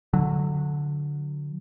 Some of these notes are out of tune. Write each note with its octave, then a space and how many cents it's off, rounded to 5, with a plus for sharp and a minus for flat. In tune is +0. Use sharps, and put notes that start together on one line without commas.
D3 +0 F#3 -20